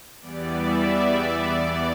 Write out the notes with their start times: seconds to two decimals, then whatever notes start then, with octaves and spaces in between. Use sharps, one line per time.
0.21 E2 E3 G3 B3 D5
0.52 E5
0.82 D5
1.42 E2 E3 B3 D5